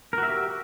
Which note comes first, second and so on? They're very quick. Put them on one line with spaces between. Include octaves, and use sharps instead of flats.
A#4 F#4 E5 G4